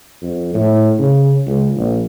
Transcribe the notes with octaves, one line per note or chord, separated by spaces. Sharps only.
F2
A2
C#3
C#2
A#1